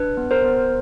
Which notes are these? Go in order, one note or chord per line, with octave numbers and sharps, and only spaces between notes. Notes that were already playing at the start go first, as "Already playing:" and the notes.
Already playing: D4 B4
B3
A#4 C5
B3